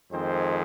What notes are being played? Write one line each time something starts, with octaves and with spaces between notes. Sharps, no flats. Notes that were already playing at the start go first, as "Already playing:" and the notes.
F2 D#3 G#3 C4 C5